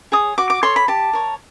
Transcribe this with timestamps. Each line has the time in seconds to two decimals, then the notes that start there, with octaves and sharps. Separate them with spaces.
0.12 G#4 C#5 D#6
0.38 F#4 D6
0.50 D6
0.63 A4 C#5 C6
0.76 B5
0.88 G4 A5
1.13 A#4 C#5